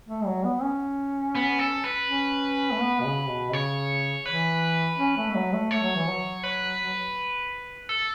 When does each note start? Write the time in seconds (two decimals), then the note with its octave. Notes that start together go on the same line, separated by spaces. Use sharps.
0.08 A3
0.26 F#3
0.44 B3
0.63 C#4
1.35 B3
1.59 A4
1.84 B4
2.08 C#4
2.72 A3
2.81 B3
3.00 B2
3.05 C#3
3.29 B2
3.53 C#3 C#5
4.26 E3 B4
4.98 C#4
5.17 A3
5.30 A3
5.35 F#3
5.53 A3
5.71 A3 C#5
5.83 F#3
5.96 E3
6.09 F#3
6.44 B4
7.89 A4